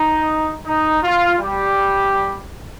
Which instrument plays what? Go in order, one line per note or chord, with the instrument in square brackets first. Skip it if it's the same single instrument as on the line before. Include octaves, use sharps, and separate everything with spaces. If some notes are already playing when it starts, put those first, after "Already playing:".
Already playing: [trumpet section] D#4
D#4
F4
G3 G4